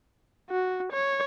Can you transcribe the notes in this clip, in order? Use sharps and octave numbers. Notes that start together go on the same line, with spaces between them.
F#4
C#5